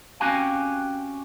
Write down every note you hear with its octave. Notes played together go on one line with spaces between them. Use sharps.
C4 C#4 F#4 G4 F5 G#5